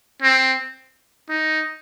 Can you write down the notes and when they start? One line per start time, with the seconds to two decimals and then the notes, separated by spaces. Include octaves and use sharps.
0.22 C4
1.29 D#4